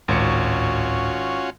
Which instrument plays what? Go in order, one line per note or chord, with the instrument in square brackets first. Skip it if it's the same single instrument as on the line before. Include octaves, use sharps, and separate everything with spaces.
[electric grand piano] G#1 C#6 C#7 [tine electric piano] D2 A2 [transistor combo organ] C#4 F4 F#4